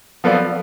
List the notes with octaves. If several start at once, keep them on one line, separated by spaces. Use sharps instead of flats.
F3 B3 F4 A4 D5